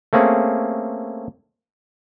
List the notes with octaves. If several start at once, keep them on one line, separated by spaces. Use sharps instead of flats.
A3 A#3 C4 C#4 G#4